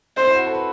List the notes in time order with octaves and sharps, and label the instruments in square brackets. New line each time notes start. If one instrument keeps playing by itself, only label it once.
[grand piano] C4 [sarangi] C5
[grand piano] E4
F#4
A4
B4